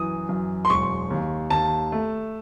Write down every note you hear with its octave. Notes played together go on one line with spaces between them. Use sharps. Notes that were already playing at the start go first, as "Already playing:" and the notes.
Already playing: F#2 E3 D#6
F#2
C6
E1 C#6
D#2
D#2 A5
A3